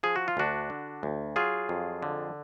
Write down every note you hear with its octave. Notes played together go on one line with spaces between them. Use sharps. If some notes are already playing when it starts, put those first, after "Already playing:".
F3 G#4
F#4
F4
D2 D4 F#4
D3
D2
F#3 F4 G#4
F2
D3